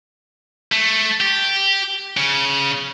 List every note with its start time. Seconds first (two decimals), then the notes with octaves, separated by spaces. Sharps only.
0.72 A3
1.21 G4
2.17 C#3